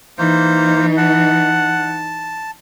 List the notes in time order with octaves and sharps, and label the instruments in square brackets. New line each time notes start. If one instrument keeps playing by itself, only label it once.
[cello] E3 D#4 [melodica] A#3 C5
[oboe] F#5 [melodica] A5